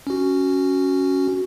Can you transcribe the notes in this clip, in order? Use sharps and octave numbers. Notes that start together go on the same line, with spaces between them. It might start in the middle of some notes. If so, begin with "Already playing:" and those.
C#4 F#4